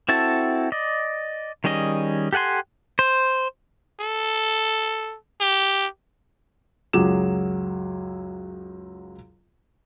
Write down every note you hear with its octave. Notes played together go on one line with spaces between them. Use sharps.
C4 E4 F#4 A4 A5
D5 D#5
D#3 G3 C#4 G#4 D#5
G4 A4 F#5 G#5 C6
C5
A4
G4
C#2 F#2 F#3 G#4 D6 E7